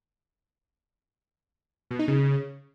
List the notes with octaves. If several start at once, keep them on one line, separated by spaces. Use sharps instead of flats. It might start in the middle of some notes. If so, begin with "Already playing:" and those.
B2
D#4
C#3